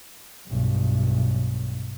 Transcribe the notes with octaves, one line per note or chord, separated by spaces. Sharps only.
B1 G2